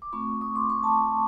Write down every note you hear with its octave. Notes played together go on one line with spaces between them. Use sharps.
D6
A3 C4 F4 B5 C#6
C#6 D#6
C6 D6
B5 C#6
A5 B5